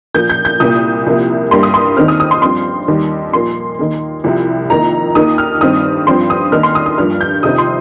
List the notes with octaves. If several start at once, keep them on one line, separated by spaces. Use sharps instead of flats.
A#2 F3 A#3 G6
G6
G6
C2 A#2 A#3 D#6
C2 C3 F3 A#3
G2 G3 A#3 C6
D#6
C6
D#2 D#3 C4 F6
D#6
D#6
C6
G2 F3 C4 C6
D#2 D#3 G3
A#2 F3 A#3 C6
D#2 D#3 A#3
C2 C3 F3
F2 D#3 A#3 A#5
D#2 D#3 A#3 D#6
F6
G2 D#3 C4 D#6
G2 F3 C4 C6
D#6
D#2 D#3 A#3 F6
C6
D#6
D#6
G2 F3 A#3 F6
G6
F2 C3 D#3 C4 D#6
C6